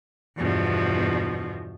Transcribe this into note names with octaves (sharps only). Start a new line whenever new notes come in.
E2 G2 B2 F3